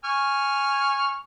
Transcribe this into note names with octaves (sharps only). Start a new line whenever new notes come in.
G#5 C#6 F6